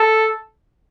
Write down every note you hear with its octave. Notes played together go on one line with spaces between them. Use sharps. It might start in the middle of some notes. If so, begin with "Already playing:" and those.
Already playing: A4